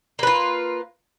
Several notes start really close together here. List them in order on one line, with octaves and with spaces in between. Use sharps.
A#3 B4 F4